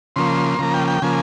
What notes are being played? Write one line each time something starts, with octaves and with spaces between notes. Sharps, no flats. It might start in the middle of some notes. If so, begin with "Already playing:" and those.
C#3 F3 A#3 C6
C#3 F3 A#3 A#5
G5
G5
C#3 F3 A#3 G#5